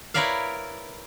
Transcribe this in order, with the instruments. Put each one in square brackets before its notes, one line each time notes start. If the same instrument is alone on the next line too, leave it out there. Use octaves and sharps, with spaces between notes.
[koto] E4 A#4 B4 C#5 D5 F5